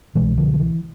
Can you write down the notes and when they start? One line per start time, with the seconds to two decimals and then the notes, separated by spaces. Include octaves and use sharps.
0.15 C2 B2 E3 G#3
0.38 D3 F3
0.54 F3
0.60 E3